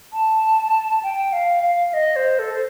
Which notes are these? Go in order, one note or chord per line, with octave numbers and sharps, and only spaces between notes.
A5
G5
F5
F5
D#5
C5
A4
C5